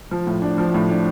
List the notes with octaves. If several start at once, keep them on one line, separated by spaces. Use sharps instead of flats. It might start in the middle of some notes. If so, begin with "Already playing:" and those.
F3
A2
D4
F3
A2
D4